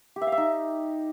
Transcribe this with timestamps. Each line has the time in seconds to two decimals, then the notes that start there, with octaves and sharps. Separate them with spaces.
0.16 G4
0.21 E5
0.27 F5
0.32 E5
0.38 D#4